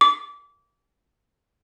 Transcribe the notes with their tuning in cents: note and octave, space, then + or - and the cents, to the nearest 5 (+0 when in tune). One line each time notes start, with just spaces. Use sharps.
D6 -30